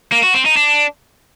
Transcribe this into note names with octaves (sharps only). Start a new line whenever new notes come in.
A#3
F#4
C4
D#4
D4